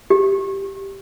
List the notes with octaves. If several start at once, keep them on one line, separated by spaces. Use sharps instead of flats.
G4